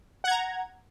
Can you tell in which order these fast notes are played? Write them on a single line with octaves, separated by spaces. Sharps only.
F#5 G#6 A#5